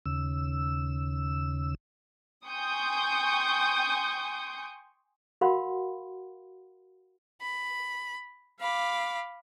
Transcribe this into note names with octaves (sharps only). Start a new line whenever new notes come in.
D#2 C#3 E6
G5 G#5 C6 C#6 D#6 G6
F#4 A#4 F5 F#5 B5 C6
B5
F5 B5 D6